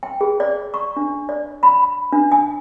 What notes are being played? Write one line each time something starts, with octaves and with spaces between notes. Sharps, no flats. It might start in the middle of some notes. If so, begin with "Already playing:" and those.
G5
G#4
D5
C#6
D4
D5
B5
D4
G#5